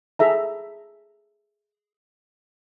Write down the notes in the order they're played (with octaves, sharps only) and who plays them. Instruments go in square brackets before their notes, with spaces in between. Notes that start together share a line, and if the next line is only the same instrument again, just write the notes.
[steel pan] G#4 A4 E5 A#5